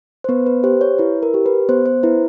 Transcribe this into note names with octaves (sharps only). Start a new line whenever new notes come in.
C5
B3 B4
B4
G4 C5
C#5
E4 B4
A#4
G4
B4
B3 C5
C5
E4 B4